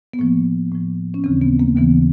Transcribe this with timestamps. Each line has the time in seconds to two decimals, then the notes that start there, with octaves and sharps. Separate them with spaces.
0.14 B3
0.19 A2 F3 A#3
0.72 A2 F3
1.14 C#4
1.24 D#2 C#3 E3 C4
1.41 B3
1.59 A#3
1.76 D#2 C#3 E3 B3